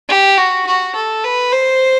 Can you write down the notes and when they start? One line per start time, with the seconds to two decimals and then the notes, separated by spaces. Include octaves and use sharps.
0.09 G4
0.38 F#4
0.67 F#4
0.95 A4
1.24 B4
1.52 C5